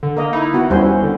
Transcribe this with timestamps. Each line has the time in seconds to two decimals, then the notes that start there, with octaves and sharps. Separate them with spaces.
0.03 D3
0.17 A#3 A#4 D#5
0.33 D#4 E4
0.54 B3 F#4
0.70 D#2 G3 C#4 E4 C5
1.02 D3